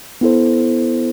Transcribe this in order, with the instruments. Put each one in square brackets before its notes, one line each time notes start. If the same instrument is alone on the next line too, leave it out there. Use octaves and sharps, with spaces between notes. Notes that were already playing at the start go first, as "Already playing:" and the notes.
[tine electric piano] B3 E4 A4 C5